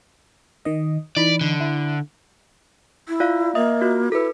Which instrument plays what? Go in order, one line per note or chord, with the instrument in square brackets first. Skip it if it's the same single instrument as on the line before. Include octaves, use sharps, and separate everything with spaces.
[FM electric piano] D#3 D#5
[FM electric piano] E3 D#4 B5 [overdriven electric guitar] D5
[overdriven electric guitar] D3
[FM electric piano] E4
[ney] E4
[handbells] F4 D5 F5
[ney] A#3 [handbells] D#5 E5 D#6
[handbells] F4 F#4
[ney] E4 [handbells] A4 B4